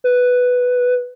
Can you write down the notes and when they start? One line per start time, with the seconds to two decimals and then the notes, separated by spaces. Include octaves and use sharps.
0.04 B4